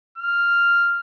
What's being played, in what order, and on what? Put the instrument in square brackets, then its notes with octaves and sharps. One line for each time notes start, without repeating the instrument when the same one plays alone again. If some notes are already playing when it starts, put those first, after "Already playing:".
[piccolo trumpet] F6